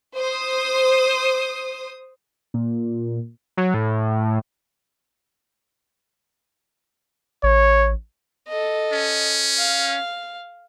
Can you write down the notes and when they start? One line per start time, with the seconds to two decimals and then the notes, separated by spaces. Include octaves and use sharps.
0.15 C5 D#6
2.54 A#2
3.57 F#3
3.74 A2
7.43 A1 C#5
8.48 A4 D#5
8.93 C#4
9.58 F5